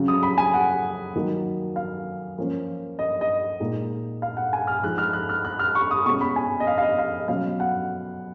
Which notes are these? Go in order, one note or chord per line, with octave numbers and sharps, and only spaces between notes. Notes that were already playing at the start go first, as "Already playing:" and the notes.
Already playing: C#3 F#3 C#4
D#6
B5
G#5
F#5
D#3 F#3 A#3 D#4
F5
F3 A#3 C#4
D#5
D#5
A#2 G#3 D#4
F5
F#5
G#5
F6
F3 G#3 D#4 F#6
F6
F#6
F6
F#6
F6
C#6
D#6
B2 G#3 C#4 C#6
B5
G#5
D#5
F5
F5
D#5
F5
D#5
B2 F#3 C#4 F5
F#5